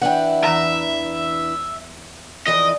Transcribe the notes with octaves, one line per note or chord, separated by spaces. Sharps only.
E3 D4 E4 F#5 G5
E2 E5 A#5
F2 E3 D5 D#5